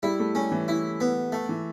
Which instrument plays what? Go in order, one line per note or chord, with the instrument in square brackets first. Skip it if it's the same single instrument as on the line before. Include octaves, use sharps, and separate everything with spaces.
[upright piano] G3 [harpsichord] E4
[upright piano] A3
[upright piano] G3 [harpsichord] C#4
[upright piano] E3
[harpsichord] E4
B3
A3
[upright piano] E3